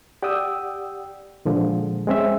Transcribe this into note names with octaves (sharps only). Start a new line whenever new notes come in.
G4 D5 F#5 G5 D#6 E6
A#2 D3 F3 G#3
G#3 C4 C#4 E5